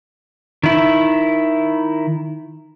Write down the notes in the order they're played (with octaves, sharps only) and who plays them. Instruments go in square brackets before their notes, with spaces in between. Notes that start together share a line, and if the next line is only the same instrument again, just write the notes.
[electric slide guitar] D#3 E4